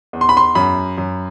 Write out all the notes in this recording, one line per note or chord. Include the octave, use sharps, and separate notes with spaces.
E2
C6
B5
C6
F#2 B5
F#2